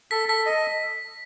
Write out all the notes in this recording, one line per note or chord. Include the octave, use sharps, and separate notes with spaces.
A4 B6
A4 B6
D#5